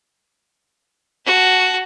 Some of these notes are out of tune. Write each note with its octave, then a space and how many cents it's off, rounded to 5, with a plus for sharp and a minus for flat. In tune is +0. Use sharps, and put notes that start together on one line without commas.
F#4 +0 A5 +0